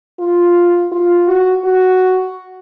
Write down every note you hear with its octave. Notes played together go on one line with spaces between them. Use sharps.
F4
F4
F#4
F#4